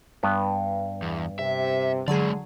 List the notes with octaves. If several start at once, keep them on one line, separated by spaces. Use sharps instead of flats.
G2 B3
E2
C3 E5
D3 F#3 G#3 G#4 D5